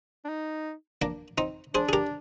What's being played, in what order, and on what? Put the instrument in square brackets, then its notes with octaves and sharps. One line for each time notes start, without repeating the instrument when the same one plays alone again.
[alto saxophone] D4
D#4
[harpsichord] A#3 D4
C4 D#4
[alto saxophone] D4 [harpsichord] G#4 C5
[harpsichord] G#4
G4 A#4